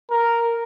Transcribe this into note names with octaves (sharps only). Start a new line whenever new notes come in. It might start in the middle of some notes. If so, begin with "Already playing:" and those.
A#4